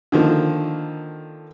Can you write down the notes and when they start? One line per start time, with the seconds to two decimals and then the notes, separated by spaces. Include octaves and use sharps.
0.12 D3 D#3 F3 A#3